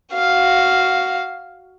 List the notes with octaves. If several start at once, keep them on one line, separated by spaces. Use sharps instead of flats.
F#4 F5